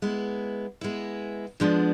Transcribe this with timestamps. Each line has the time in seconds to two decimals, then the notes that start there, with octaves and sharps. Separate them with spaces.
0.02 G#3 B3 E4
0.81 G#3 B3 E4
1.60 D3 F3 G#3 B3 D4